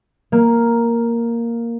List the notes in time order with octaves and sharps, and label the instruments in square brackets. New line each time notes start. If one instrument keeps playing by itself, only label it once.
[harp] A#3